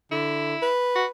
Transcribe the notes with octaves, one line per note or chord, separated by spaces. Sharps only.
D3 E4
B4
F#4